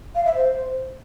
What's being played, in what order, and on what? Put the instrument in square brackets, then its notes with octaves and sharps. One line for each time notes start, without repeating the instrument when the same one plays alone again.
[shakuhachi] F5
E5
C5